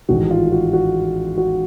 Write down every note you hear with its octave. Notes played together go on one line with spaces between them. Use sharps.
A1 G#2 D#3 F#4
F4
F#4
F#4
F#4